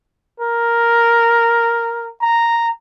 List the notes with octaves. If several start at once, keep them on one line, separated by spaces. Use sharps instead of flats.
A#4
A#5